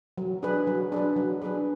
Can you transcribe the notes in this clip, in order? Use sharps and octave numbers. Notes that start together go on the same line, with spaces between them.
F#3
D4 G#4 B4
F#3
D4 G#4 B4
F#3
D4 G#4 B4